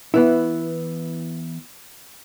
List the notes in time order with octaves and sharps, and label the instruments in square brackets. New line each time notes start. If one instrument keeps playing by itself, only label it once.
[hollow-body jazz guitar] E3 B3 E4